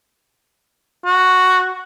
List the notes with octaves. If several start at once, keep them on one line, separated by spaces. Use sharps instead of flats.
F#4